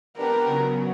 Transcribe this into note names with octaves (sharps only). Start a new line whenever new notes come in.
B3 D4 G4 A#4 B4
C#3 F#3 B3